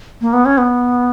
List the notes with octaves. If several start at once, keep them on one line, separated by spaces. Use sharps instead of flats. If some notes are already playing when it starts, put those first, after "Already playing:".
A#3
B3
C#4
B3